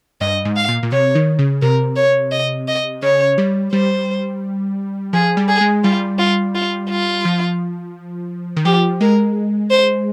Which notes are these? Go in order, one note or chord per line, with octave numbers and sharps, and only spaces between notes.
G2 D#5
G#2
F5
A#2
A#2
C3 C#5
D#3
C#3
C3 A#4
C#5
D#5
D#5
C#3 C#5
G3
G3 C5
F3 G#4
G3
G#4
G#3
G3 F4
F4
F4
F4
F3
D#3
F3 G4
G#3 A#4
C5